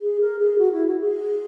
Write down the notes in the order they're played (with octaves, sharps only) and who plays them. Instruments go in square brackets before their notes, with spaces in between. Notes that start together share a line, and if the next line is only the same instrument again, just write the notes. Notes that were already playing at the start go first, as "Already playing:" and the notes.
[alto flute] G#4
A#4
G#4
F#4
E4
F#4
G#4